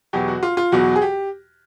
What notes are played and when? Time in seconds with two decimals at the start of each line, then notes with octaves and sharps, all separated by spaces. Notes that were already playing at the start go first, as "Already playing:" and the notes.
0.13 E2 B2 F#3 G4
0.28 F#4
0.43 F4
0.57 F4
0.72 E2 B2 F#3 F#4
0.96 G#4
1.02 G4